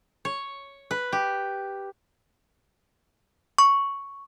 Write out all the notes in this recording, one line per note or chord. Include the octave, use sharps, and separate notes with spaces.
C#5
B4
G4
C#6